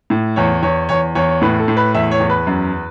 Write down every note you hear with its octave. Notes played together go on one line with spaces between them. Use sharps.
A2
E2 C#5
E2 C#5
E2 C#5
E2 C#5
C#5
A2 B4
A4
A2
B4
E2 E5
C#5
E2
B4
F#2